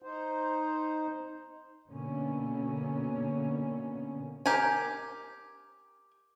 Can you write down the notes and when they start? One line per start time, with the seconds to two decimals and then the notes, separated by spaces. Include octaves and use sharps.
0.02 D#4 C5
1.88 B2 D3 A#3 B3 C#4
4.46 G4 A#4 G5 G#5